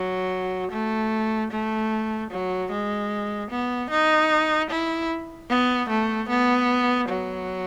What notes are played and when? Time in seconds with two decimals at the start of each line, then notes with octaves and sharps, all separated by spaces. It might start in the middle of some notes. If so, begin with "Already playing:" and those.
Already playing: F#3
0.72 A3
1.52 A3
2.31 F#3
2.72 G#3
3.51 B3
3.91 D#4
4.70 E4
5.50 B3
5.89 A3
6.29 B3
7.09 F#3